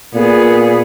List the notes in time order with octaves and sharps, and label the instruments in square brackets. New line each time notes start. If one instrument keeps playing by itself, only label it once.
[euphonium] A#2 [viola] B3 G#4